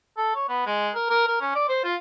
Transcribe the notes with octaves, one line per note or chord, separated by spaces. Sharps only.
A4
C#5
B3
G#3
A#4
A#4
A#4
C#4
D5
C5
F4